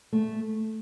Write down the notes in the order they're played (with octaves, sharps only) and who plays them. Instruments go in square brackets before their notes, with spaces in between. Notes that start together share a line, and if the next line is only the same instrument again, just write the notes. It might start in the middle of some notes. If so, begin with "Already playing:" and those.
[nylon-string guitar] A3